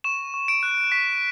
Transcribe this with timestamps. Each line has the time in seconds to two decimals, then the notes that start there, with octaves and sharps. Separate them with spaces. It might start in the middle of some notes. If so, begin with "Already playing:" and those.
0.04 C#6 E7
0.34 C#6
0.48 D7
0.63 F#6
0.92 C#6 B6